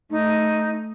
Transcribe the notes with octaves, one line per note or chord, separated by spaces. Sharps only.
A3 D#4